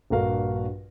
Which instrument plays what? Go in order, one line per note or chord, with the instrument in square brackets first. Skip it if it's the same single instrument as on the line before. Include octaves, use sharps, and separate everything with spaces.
[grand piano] A#1 G2 F#4 A#4 F5